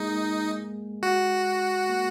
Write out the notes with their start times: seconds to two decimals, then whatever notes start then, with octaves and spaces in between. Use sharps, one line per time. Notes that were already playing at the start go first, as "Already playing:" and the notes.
Already playing: G#3 A#3 D#4
1.03 G#3 F#4
1.90 A#3